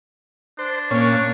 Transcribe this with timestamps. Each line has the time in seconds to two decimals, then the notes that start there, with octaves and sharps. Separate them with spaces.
0.59 D4 C5
0.91 A#2 A#3 C#4 C#5